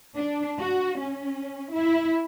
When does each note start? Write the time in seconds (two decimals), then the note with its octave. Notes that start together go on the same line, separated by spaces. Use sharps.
0.16 D4
0.59 F#4
1.00 C#4
1.72 E4